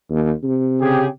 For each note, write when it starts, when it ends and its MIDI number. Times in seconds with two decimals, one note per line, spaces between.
0.11 0.32 39
0.44 1.08 48
0.81 1.08 49
0.81 1.08 67
0.81 1.08 68